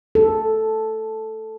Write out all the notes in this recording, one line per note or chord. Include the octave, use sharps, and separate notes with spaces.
A4